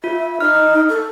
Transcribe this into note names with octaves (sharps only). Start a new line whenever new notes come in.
F4 E5
D#4 F6
A4